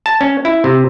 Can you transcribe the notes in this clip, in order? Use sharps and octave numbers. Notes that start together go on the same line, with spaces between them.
A5
C#4
E4
C3